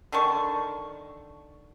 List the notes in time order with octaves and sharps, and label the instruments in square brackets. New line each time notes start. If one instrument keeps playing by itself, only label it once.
[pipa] D3 D#3 A5 C#6